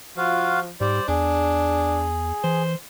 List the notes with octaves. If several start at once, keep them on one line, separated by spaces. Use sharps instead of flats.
F3 F4 F#4 F5
G#2 G3 C5 D5
E2 D4 G#4
E3 C5